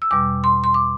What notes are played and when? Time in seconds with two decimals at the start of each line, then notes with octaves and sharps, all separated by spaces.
0.02 E6
0.11 E2 B2 G3 D6
0.44 C6
0.64 C6
0.74 D6